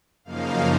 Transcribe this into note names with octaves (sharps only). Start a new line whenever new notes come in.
F#2 C#3 F3 A#3 D#4 F5